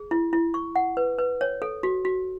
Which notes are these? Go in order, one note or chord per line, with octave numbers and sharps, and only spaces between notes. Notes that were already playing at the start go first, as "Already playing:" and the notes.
Already playing: G#4
E4
E4
C#6
F#5
B4
B4
C#5
A4
F#4
F#4